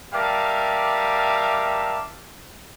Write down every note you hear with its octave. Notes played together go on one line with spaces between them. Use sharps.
G3 A#4 E5 F5 A5 D6